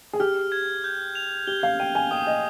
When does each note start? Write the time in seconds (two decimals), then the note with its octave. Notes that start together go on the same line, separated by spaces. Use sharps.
0.13 G#4
0.20 G4 F6
0.52 G#6
0.84 G6
1.15 F7
1.47 G4 G7
1.63 F5
1.80 G5 D#7
1.95 G#5
2.11 G5 D#6
2.27 D#5